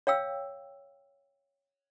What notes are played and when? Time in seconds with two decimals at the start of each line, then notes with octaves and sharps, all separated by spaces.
0.07 C#5 F5 G5 E6